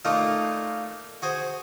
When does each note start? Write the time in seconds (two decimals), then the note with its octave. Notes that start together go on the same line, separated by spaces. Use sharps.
0.05 A#2 A3 A#3 D#4 F4
1.22 F#4 G#4 C5